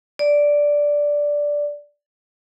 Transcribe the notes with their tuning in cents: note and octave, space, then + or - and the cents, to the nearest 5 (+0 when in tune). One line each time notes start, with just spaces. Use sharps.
D5 -5